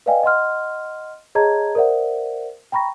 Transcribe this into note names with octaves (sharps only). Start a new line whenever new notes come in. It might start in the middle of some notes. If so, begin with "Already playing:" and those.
B4 D5 D#5 F5 G5 G#5
D#5 F#5 C6 F6
G#4 C#5 D#5 A5 A#5 G#6
A#4 C5 D5 E5 F#5
G5 A#5 B5 C#6 A#6